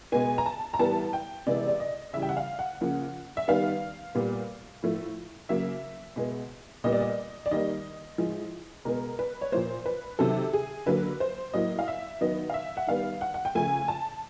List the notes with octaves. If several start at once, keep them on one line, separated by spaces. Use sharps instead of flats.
B2 G#3 B3 G#5
A#5
A5
A#5
A2 E3 G3 B3 A5
G5
C3 E3 G#3 B3 D5
D5
D#5
C#3 E3 G3 E5
G5
F#5
F5
F#5
C#3 F3 A#3
E5
D#3 G3 B3 F5
A#2 G3 B3
A2 F3 A3
C#3 F#3 A#3 E5
B2 G#3 B3
A#2 G3 B3 D#5
D5
D#5
D5
D#3 G3 A#3 D#5
A2 F3 G#3
B2 G#3 B3 A#4
B4
C#5
A#2 F3 A#3 C5
B4
C3 D#3 F#3 A4
G#4
D3 F#3 A#3 B4
C5
A2 F#3 A#3 D#5
F5
E5
D#3 F#3 B3 D#5
F5
E5
F#5
D#3 G3 B3 F5
F#5
F#5
G5
C#3 F3 A3 G#5
A5